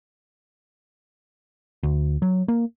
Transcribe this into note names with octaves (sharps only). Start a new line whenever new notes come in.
D2
F#3
A#3